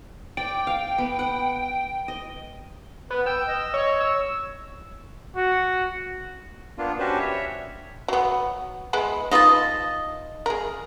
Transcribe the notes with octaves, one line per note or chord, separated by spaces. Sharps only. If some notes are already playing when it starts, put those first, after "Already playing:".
D5 G5
F5
B3
F#5
D#5
B3 B4
G5 E6
D#5
C#5
E6
F#4
A#3 B3 D4 F4
C#4 D4 F#4 G4 B4 C5
C#5 E5
F#3 B3
G#3 B3 E4
D#4 F4 B4 D#5 A5
G#4 A#4